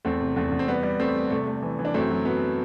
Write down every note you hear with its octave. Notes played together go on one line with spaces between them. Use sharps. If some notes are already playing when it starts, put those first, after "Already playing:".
E2 A3 C4
C3
E2 A3
E2
C4
G3 B3
G3
G3 A3 C4
G3
C3 A3
A3
E3
E3
D4
F#2 A3 C4
F#3
F#2 B3